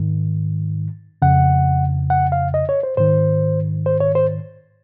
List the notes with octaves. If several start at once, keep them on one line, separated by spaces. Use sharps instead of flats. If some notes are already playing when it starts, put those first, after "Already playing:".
Already playing: G#2 D#3
F2 C#3 F#5
F#5
F5
D#5
C#5
C5
G#2 D#3 C5
C5
C#5
C5